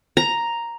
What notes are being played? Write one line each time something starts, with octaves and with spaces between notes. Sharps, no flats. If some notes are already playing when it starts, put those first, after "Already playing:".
A#5